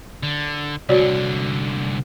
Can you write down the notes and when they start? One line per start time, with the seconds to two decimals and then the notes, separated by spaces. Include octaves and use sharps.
0.23 D3
0.89 C2 D3 F#4 C#5 D5